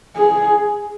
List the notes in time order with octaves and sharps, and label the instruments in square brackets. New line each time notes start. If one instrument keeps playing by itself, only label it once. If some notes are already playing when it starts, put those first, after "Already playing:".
[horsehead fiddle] G#4